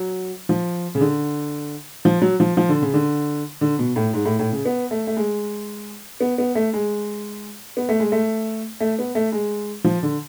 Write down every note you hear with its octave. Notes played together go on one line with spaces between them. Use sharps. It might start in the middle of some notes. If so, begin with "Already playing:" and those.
Already playing: F#3
F3
C#3
D3
F3
F#3
F3
F3
D3
C#3
D3
D3
B2
A2
G#2
A2
A2
C#3
B3
A3
A3
G#3
B3
B3
A3
G#3
B3
A3
G#3
A3
A3
B3
A3
G#3
F3
D3